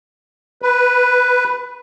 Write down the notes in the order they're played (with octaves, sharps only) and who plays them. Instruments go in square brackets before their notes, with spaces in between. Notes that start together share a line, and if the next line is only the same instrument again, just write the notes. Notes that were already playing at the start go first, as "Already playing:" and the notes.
[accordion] B4